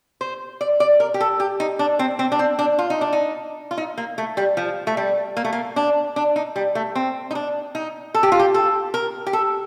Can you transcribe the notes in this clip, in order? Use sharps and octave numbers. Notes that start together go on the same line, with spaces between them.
C5
D5
D5
A#4
G4
A4
G4
D#4
D4
C4
C4
D4
C4
D4
F4
D#4
D4
D#4
F4
D#4
A#3
A3
G3
F3
A3
G3
A#3
A3
A#3
D4
D4
D#4
G3
A3
C4
D#4
D4
D#4
A4
G4
F4
G4
A4
A#4
G4
A4